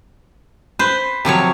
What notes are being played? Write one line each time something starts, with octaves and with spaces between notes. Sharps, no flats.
B4 C5
C3 F3 F#3 C#5